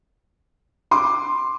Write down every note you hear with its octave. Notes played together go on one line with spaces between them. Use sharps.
C6 D6